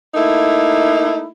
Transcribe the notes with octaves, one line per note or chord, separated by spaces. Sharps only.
A3 A#3 D#4 E4